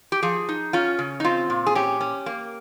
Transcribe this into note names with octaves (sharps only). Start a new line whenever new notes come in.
G4
F3 G#4
D#4
C#4 F4
C#3
D#4
C4 F4
A#2
G#4
C#4 G4
C#4
A#3